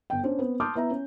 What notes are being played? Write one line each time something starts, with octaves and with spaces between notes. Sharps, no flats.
G1 G5
C#4 D4 C5 C#5
B3 C4
A5 C6 D6 D#6 F6 G6
B3 E4 E5 A#5
C#4